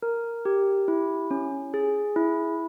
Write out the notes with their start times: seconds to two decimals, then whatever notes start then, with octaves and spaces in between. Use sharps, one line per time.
0.03 A#4
0.45 G4
0.88 E4
1.31 C#4
1.74 G#4
2.16 E4